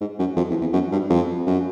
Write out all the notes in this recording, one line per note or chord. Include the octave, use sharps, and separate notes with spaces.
G#2
F#2
F2
E2
E2
F#2
G2
F2
F#2